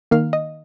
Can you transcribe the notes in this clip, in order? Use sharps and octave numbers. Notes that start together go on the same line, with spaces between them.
D#3 A#3 F5
D#5